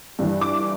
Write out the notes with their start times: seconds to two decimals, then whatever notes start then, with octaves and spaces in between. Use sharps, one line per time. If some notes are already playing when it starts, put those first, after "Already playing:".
0.19 G2 E3 G3
0.41 D6